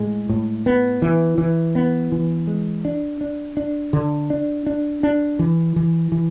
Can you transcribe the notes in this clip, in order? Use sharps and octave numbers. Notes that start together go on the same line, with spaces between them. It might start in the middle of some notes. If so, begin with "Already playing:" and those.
Already playing: A2 G#3
A2
B3
E3
E3
B3
E3
G#3
D4
D4
D4
D3
D4
D4
D4
E3
E3
E3